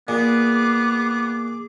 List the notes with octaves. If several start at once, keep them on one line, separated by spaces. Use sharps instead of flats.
A#2 B3 G#4 D6